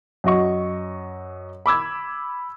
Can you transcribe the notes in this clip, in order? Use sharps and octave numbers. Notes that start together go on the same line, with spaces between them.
F#2 F#4 D#5 C#6
B5 D6 E6 G#6